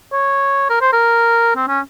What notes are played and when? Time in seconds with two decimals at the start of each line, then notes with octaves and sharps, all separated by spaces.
0.13 C#5
0.70 A#4
0.81 C5
0.93 A#4
1.56 C4
1.68 C#4